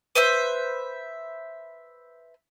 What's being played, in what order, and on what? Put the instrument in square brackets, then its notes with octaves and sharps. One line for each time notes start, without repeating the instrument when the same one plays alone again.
[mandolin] B4 C5 E5 C6